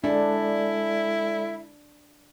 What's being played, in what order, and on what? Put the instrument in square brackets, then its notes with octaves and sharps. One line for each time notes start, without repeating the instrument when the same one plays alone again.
[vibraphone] G#3 A4 D5 [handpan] D4 [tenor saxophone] E4